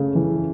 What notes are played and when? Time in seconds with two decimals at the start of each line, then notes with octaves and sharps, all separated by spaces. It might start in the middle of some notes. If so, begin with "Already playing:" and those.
Already playing: C#3 A3
0.15 E3